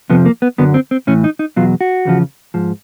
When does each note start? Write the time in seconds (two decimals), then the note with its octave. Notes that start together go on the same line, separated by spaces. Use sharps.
0.10 F2 C3 F3 B3
0.26 A#3
0.42 B3
0.58 F#2 D3 F#3 B3
0.74 C4
0.91 C4
1.07 A2 E3 C#4
1.24 D#4
1.39 D#4
1.56 E2 B2 F#3 F4
1.81 F#4
2.05 E2 C#3 F3
2.54 G#2 F3